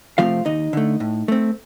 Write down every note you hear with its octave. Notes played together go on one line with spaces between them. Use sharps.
C3 F3 A3 C4 F4 F5
D#2 D#4 D#5
D3 A3
A2
A3 C4